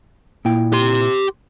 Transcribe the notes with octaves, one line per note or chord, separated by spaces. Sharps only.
A#2 E4 G5
G4 C6